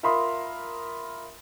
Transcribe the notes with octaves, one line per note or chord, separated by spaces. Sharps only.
F4 A#4 E5 B5 C6 D#6